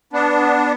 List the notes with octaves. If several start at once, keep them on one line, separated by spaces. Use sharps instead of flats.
B3 D4